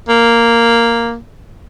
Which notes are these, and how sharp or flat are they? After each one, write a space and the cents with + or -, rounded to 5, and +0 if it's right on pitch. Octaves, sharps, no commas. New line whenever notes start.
A#3 -5